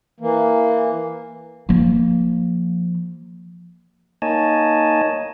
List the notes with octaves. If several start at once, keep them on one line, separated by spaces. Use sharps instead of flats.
E3 A#3
F3 A#3
A#3 D#4 C#5 D#5 G#5 A5